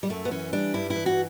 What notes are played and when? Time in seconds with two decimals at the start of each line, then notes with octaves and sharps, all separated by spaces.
0.03 G3
0.10 F#2 A3
0.25 B3
0.31 E3 C#4
0.53 G3 D4
0.74 G2 E4
0.90 E4
0.96 E3
1.06 F#4